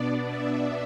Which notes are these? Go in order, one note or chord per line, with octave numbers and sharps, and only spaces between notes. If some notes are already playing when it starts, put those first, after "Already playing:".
Already playing: B2 B3 D4 D5
E5